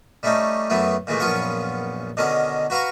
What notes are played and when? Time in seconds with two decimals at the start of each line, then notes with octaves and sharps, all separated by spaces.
0.23 G3 A3 C#4 D#4
0.70 F#2 E3 F#3 A3 B3
1.07 A#2 E3 G#3 A3
1.20 A#1 F#2 B3 C#4 F4 C#6
2.17 B2 D3 D#3 C#4 A#4
2.70 F#4 B4 F5 A#5 C#6